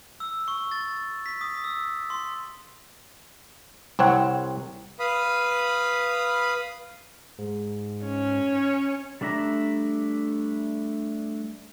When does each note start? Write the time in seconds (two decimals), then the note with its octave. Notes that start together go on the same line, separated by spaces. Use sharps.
0.20 E6
0.48 C#6
0.71 A6
1.26 B6
1.41 D#6
1.64 E6
2.10 C6
3.99 C2 C4 C#5 F#5
4.99 B4 F5 B5 D#6
7.38 G#2
8.05 C#4
9.21 G3 A3 D4 E5 A#5